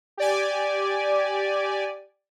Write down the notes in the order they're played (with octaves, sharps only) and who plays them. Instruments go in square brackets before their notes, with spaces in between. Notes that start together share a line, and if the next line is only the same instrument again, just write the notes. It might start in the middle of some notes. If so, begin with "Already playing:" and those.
[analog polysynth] G4 D5 G#5